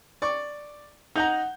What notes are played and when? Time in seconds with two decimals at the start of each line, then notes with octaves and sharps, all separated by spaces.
0.22 D5 C#6 D6
1.16 D#4 F#5 A#5 G6